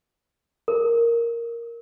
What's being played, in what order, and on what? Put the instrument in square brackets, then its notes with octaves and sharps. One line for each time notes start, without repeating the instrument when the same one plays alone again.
[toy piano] A#4